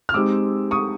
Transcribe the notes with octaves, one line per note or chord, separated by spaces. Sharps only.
F6
G#3 C4 D#4 G4 D6 E6
C#6 D#6